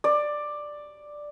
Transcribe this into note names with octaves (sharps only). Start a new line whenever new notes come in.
D5